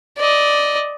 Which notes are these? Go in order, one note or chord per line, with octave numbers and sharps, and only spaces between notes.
D5 D#5